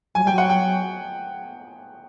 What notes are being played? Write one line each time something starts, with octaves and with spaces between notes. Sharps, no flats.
F#3 G#5
G3 G5
F#3
F#5
G5